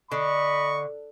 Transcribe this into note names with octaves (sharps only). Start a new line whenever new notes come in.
D3 D#5 B5 C#6